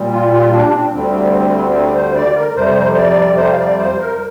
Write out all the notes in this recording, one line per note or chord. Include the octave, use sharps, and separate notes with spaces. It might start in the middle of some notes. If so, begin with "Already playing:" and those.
Already playing: A#2 G3
F4
F4
D4
C4
D2 D3 G3 C4
C4
C5
D5
A#4
F2 C3 G3 C5
C5
D5
C5
F5
D5
C5
A#4